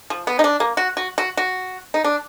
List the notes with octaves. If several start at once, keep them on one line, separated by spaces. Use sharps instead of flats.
F3
B3
D#4
D4
A#3
F#4
F#4
F#4
F#4
D#4
D4